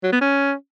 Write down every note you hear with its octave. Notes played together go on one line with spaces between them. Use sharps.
F#3
B3
C#4